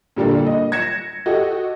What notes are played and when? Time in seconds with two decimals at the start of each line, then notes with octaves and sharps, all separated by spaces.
0.16 A#2 D3 G3 A#3 D4 A4
0.47 D#5
0.72 G#6 A#6 C#7 E7
1.26 F#4 G4 A4 D#5